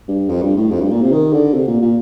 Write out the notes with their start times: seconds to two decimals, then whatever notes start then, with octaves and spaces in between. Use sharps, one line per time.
0.08 G2
0.29 F2
0.43 G2
0.57 A2
0.71 F2
0.81 G2
0.91 A#2
1.02 C3
1.12 D#3
1.33 D3
1.54 C3
1.67 A#2
1.82 A#2